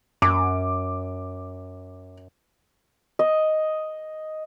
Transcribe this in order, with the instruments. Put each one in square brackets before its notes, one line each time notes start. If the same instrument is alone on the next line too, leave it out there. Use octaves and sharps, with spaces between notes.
[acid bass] F#2 [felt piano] D6
[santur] D#5